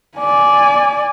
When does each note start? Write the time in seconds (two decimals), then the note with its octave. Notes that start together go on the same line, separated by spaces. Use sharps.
0.18 D5 G#5